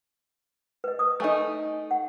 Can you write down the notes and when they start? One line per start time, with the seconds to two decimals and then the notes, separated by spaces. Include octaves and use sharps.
0.84 B4 D#5
0.99 B4 D#6
1.20 A3 D#4 A4 G#5 C#6
1.91 F#5